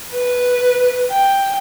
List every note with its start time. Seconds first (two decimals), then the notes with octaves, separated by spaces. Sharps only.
0.13 B4
1.11 G5